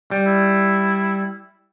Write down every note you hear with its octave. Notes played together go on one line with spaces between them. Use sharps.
G3
E4